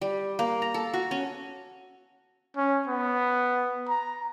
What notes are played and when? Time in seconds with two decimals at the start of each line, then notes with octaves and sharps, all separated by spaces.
0.01 G3
0.39 A#3
0.62 A#5
0.74 A4
0.94 F#4
1.11 C#4
2.57 C#4
2.88 B3
3.88 A#5